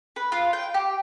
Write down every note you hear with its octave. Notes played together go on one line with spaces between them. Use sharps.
B4
F4
G5
G4